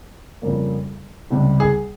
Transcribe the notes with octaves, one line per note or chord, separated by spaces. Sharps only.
F2 C#3 G3 A#3
C#2 C3 G3
G#4